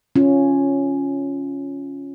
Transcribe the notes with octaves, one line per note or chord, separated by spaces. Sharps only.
C#4 F4